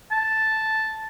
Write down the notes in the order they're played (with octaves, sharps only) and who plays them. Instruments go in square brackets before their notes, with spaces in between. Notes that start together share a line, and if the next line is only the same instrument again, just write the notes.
[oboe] A5